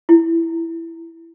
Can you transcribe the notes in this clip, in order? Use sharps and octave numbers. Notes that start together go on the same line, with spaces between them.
E4